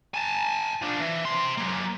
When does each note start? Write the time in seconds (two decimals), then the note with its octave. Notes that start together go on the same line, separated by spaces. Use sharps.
0.14 G#5 A5
0.82 F3 D4
1.00 E3
1.25 C3 C6
1.57 F#3 A#3